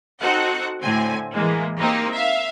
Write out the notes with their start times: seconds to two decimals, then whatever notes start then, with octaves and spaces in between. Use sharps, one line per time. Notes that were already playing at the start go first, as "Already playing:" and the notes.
0.22 C4 D#4 F#4 A4 F#5
0.82 A2 D3 C4 G#5
1.33 E3 G#3 A#3
1.78 A#3 C4 D#4 G4
2.13 E5 F5